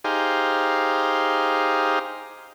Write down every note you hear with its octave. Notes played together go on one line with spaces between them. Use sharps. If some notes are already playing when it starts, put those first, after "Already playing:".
D#4 G4 G#4 C5 F5